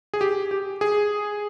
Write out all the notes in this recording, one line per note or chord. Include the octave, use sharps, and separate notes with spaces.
G#4
G4
G4
G#4